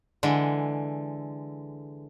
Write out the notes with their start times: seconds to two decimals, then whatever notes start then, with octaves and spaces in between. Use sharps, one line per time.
0.23 D3 E3 G#3